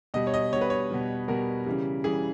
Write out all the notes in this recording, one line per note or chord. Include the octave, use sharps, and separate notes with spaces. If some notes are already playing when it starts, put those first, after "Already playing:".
B2 G3 D#5
C#5
D#5
B2 G3 C#5
B4
C#5
B2 G3
B2 G3 A#4
C#3 E3 G3
C#3 E3 G3 G#4